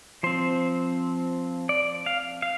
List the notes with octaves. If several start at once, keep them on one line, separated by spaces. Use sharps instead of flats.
F3 C4 C5
D5
F5
F5